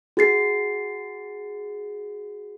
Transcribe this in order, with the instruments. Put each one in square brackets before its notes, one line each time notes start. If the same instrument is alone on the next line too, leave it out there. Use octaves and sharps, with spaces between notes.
[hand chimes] F#4 G#4 A6 C7